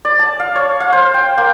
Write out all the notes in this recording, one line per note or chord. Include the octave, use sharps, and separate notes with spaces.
D5
A5
F5
C#5
F5
C5
G5
A#3